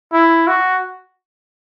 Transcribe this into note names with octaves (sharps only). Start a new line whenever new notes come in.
E4
F#4